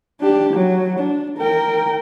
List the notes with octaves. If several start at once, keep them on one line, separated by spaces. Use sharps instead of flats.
D4 G4
F#3
D4
A#4 G5